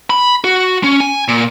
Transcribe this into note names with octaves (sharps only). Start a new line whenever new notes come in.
B5
F#4
C#4
G#5
A#2